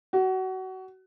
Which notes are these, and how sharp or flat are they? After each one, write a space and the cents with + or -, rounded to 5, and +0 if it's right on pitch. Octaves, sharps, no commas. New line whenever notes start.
F#4 +25